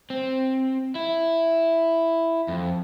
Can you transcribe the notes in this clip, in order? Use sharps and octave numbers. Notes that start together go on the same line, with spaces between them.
C4
E4
F2